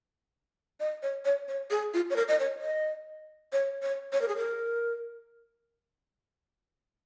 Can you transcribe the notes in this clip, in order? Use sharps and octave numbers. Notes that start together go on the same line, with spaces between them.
D#5
C#5
C#5
C#5
G#4
F4
C#5
A#4
D#5
C#5
D#5
C#5
C#5
C#5
A#4
G#4
A#4